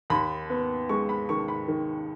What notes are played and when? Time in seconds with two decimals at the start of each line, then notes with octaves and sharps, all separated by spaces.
0.10 D#2 B5
0.50 B3
0.89 G#3 C#6
1.09 B5
1.29 D#3 C#6
1.48 B5
1.68 D#3